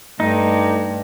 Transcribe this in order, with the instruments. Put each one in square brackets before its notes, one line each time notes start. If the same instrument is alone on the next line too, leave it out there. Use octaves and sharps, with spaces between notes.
[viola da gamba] G2 [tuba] A3 [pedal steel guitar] D#4